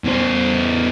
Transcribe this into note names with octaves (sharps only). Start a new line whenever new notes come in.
E2 C5